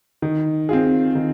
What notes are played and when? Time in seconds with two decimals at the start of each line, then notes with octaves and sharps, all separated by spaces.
0.22 D#3
0.69 C4 F4 G#4
1.15 D#3